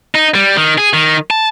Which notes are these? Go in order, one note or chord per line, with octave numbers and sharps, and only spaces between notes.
D#4
G3
D#3
G#4
D#3
A5